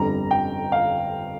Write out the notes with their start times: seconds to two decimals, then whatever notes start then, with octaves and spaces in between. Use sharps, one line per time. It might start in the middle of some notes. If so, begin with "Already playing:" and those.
Already playing: G1 F2 D3 G3 A#5
0.31 G5
0.72 F5